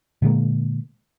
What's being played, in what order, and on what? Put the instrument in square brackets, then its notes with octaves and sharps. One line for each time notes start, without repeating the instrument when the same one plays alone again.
[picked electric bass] A#2 D3 G#3 A#3